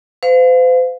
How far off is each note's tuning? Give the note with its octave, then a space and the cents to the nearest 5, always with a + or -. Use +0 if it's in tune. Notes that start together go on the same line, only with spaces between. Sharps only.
C5 -45 F5 +10